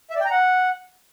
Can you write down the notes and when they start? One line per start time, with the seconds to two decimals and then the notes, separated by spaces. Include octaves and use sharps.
0.10 E5
0.15 D5
0.20 G5
0.25 A#5
0.30 F#5